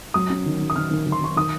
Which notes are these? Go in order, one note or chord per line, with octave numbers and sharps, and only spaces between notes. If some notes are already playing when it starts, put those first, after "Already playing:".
F#3 D#6
C#4
D#3
D#3
D#6
D#3 F6
D#3
D#3
C6
D#3 C#6
D#3 D#6